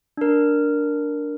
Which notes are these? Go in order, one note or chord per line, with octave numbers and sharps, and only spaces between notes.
D4 A#4